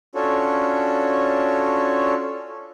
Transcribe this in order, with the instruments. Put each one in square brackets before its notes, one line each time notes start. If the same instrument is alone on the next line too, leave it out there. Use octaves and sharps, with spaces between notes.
[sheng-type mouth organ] C#4 D4 F4 F#4 A4 C#5